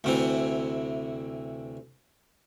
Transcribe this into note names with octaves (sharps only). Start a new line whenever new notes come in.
D2 C3 E3